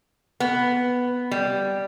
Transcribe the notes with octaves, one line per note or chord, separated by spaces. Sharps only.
B3
G3